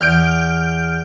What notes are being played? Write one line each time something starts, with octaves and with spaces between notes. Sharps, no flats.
E2 F6 G6 D7